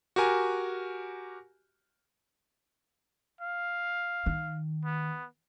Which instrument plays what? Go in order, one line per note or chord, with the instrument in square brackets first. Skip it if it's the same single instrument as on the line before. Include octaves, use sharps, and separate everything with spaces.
[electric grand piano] F#4 G4 A#4 G#5
[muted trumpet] F5
[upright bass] D#3
[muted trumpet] B3